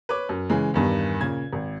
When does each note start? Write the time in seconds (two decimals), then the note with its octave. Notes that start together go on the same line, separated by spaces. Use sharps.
0.09 B4 C#5 D6
0.29 F#2
0.50 C#3 E3 G#3
0.74 E2 G2 D#3
1.20 A#2 C#3 G#6
1.53 G#1